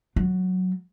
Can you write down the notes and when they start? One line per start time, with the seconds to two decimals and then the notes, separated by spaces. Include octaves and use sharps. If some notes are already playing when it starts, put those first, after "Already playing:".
0.16 F#3